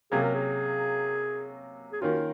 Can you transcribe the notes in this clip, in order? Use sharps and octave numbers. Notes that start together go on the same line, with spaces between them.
C3 F#3 A#3 C#4 G#4
A#4
G#4
G#4
D#3 A#3 C#4 F4 F#4